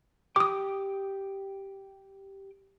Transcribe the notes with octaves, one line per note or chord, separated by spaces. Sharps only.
G4 G5 D6 D#6